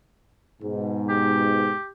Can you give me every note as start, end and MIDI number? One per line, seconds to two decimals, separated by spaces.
0.62 1.75 44
0.62 1.75 47
1.09 1.90 67